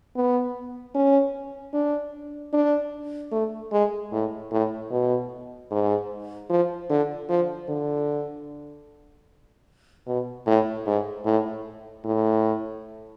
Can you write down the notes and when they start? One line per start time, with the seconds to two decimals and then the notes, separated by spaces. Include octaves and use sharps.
0.16 B3
0.95 C#4
1.73 D4
2.53 D4
3.32 A3
3.72 G#3
4.12 A2
4.51 A2
4.91 B2
5.71 G#2
6.49 F3
6.90 D3
7.29 F3
7.68 D3
10.07 B2
10.46 A2
10.86 G#2
11.25 A2
12.05 A2